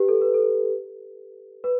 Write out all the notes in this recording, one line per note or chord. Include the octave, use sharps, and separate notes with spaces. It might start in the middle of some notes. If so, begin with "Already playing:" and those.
Already playing: G4 B4
A4
B4
A4
B4